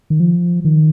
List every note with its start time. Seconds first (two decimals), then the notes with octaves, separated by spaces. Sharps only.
0.10 D#3
0.20 F3
0.65 D#3